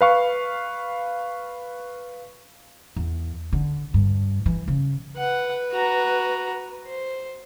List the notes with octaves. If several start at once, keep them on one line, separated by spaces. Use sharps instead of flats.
B4 F5 C#6
E2
D3
G2
E3
C#3
B4 F#5
F#4 A#5
C5